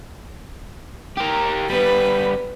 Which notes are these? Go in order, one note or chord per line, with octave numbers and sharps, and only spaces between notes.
G4 A#4
G3 B3 B4